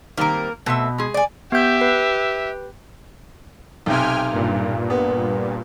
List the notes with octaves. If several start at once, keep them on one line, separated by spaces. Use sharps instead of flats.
D#3 G3 A#3 C4 A#4
B2 A3 C4 E5
G#3 G#4
D5 G#5
B3 G4 E5 G6
B4
B1 C3 G5 G#5 F6
G2 A#2
B3